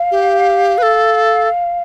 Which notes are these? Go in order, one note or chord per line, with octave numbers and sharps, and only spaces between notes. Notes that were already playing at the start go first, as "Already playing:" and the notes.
Already playing: F5
G4
B4
A4